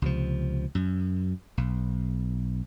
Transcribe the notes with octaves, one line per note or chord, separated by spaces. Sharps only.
C#2 C3 F3
F#2
B1